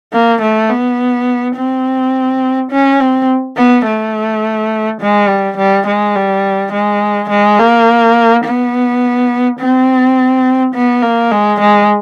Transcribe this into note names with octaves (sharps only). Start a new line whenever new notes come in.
A#3
A3
B3
C4
C#4
C4
B3
A3
G#3
G3
G3
G#3
G3
G#3
G#3
A#3
B3
C4
B3
A#3
G#3
G#3